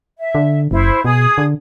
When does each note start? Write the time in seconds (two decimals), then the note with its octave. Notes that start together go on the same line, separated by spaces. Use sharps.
0.19 E5
0.35 D3
0.71 F#1 E4 C5
1.04 B2 G#4 D#6
1.38 D3